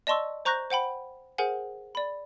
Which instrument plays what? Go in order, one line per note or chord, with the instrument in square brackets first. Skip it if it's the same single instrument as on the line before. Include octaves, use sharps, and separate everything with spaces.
[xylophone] D5 D#5 A5 C6 C#6 E6
C5 A#5 C#6 F#6 G6 A#6
C5 F#5 G5 B5
G#4 A#4 C5 F#5 G#5
D5 B5